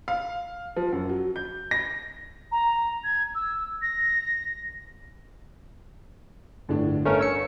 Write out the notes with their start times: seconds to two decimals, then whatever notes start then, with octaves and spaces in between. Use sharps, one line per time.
0.08 F5
0.76 F3
0.92 F#2
1.09 F#3
1.36 G6
1.71 A#6
2.52 A#5
3.04 G#6
3.35 E6
3.82 A#6
6.69 G1 A2 D3 D4
7.05 G1 A3 C#4 A#4
7.19 C#5 E6 C#7